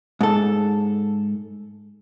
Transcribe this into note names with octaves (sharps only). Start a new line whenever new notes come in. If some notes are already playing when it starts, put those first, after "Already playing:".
G#2 A4